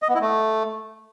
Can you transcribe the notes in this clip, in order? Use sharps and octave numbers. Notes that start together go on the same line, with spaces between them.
D#5
B3
E4
A3